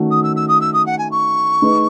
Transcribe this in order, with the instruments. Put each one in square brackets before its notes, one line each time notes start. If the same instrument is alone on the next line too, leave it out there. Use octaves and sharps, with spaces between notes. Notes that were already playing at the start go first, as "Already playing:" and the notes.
Already playing: [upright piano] D#3 A3 C#4 F#4
[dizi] D#6
E6
E6
D#6
E6
D#6
F#5
G#5
C#6
[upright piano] A3 D#4 G#4 B4